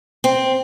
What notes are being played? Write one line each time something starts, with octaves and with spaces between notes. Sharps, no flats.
C4